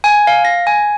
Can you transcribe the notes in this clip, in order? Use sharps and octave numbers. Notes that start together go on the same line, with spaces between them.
G#5
F5
A#6
G#5